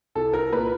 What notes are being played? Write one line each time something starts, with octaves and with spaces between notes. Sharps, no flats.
C2 A4
A#4
A#2 B4